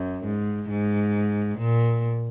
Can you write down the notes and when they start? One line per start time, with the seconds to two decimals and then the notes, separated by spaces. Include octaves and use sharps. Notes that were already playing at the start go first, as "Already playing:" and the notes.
Already playing: F#2
0.24 G#2
0.69 G#2
1.58 A#2